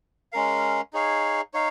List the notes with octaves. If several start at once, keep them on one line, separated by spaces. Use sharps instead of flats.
G#3 C#4 A#4 F5
D#4 G#4 C#5 F5
D#4 C#5 F5